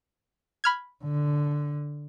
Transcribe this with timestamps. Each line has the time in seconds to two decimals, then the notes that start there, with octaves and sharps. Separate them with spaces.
0.64 B5 F6 G#6
1.05 D3